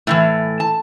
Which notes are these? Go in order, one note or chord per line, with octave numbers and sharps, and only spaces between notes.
A2 C#3 E3
A5